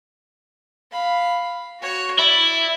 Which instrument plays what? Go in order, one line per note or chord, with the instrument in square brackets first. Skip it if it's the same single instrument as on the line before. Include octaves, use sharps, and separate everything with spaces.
[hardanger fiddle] F5 B5
F#4 C#5
[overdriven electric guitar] E4 [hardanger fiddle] D5